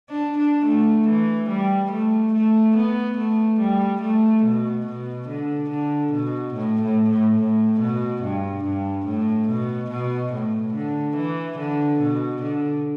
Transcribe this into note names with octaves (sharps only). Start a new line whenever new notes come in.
D4
D4
A3
E3
G3
A3
A3
B3
A3
G3
A3
B2
B2
D3
D3
B2
A2
A2
A2
A2
B2
G2
G2
A2
B2
B2
A2
D3
E3
D3
B2
D3